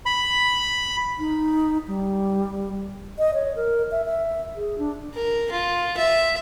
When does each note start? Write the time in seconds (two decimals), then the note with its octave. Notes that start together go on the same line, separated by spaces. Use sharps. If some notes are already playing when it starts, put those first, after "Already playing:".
0.06 B5
1.19 D#4
1.88 G3
3.18 D#5
3.34 C#5
3.56 A#4
3.91 E5
4.05 E5
4.55 G#4
4.78 D4
5.14 A#4
5.51 F4
5.97 E5